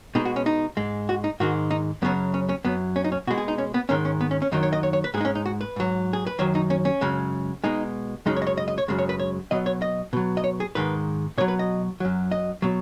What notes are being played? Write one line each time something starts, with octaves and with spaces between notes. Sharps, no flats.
B2 G#3 D#4
F#4
C#4
D#4
G#2 G#3
F#4
D#4
G#2 D#3 G#3 F#4
D#4
F#2 C#3 F#3 B3
C#4
C#4
F#2 F#3 B3
C#4
D#4
C#4
B2 G#3 F#4
G#4
D#4
C#4
B3
G#2 D#3 G#3 C#4
C#4
B3
C#4
C#4
F#2 D#3 F#3 D#4
C#5
D#5
C#5
C#5
B4
G#2 G#3 D#4 G#4
C#4
D#4
F#4
B4
G#2 F#3
G#4
B4
F#2 D#3 F#3 C#5
D#4
C#4
C#4
F#2 C#3 G#3
B2 G#3 D#4
F#2 C#3 G#3 D#4
C#5
D#5
C#5
D#5
D#5
C#5
F#2 C#3 G#3
C#5
B4
C#5
B2 F#3 D#5
C#5
D#5
B2 F#3
D#5
C#5
G#4
G#2 D#3 G#3 B4
B2 F#3 C#5
B4
D#5
F#2 F#3
D#5
B2 F#3